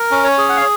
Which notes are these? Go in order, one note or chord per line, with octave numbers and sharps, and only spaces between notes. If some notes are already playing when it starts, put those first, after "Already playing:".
Already playing: A#4
C#4
C#5
G#4
F#5
F5